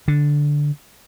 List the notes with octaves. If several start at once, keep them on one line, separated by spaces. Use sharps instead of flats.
D3